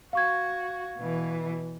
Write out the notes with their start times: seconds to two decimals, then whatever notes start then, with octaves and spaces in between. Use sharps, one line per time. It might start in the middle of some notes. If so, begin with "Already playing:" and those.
0.13 F#4 F5 C#6 G#6
0.97 B2 E3